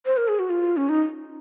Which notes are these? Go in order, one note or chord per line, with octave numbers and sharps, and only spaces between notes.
C5
A#4
G#4
F#4
F4
C#4
D#4